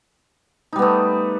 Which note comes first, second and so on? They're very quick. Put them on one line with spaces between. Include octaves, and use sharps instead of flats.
D#4 G3 B3 A3